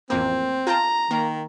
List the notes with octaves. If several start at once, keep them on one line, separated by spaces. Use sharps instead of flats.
A1 F2 A#3 C4
F4 G5 A5 A#5
D#3 A#3